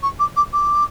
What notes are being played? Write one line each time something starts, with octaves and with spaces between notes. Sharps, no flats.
C#6
D6
D6
D6